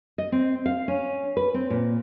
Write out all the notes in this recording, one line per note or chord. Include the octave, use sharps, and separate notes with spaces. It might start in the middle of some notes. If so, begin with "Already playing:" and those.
D#5
C4
F5
C#4
B4
C4
A#2